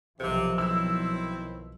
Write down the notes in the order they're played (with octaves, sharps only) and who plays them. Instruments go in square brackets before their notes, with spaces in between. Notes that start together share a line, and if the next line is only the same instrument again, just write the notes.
[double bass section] B1 D#3 F3 [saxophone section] F2 C3
[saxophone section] C4 E4 [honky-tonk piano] E6